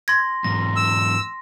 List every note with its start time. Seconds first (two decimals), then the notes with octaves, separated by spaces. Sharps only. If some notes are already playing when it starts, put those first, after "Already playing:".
0.08 C6 G#6 A#6
0.44 E2 G#2 A#6
0.76 E6